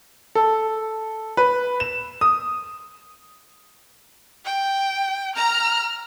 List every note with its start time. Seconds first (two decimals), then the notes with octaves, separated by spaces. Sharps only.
0.35 A4
1.37 B4
1.80 E7
2.21 D#6
4.45 G5
5.35 A#5 F6